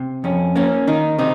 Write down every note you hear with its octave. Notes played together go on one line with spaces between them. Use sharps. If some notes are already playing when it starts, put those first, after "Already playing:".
Already playing: C3
F2 C#4
A#3 C#4
D#3 D#4
C3 D#4